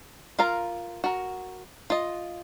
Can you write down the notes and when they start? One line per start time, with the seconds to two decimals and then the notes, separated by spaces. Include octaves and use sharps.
0.39 F4 A#4 F5 A#5
1.04 F#4 A#4
1.90 F4 D#5